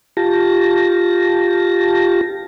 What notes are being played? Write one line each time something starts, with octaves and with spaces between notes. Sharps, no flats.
F4 G4 A5 A#6